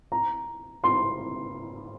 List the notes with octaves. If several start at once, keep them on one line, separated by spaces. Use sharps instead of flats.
A#5
C6